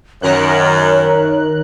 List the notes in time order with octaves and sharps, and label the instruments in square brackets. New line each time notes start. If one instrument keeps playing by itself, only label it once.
[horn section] F#2 [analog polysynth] D#3 A#4 F#6 [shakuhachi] C#5